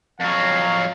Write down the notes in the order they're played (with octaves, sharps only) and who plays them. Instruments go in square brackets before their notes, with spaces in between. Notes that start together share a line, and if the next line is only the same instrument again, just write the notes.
[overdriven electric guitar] F2 F#3 [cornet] F5